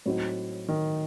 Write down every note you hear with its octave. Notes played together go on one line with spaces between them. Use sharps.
A2 F#3 C4 D#4 F#4
D#3